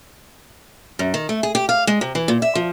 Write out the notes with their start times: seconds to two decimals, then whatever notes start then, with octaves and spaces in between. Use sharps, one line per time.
0.99 F#2
1.14 D#3
1.29 A3
1.43 G#4
1.55 G4
1.69 F5
1.87 G#3
2.01 C3
2.15 E3
2.28 A#2
2.42 E5
2.55 F3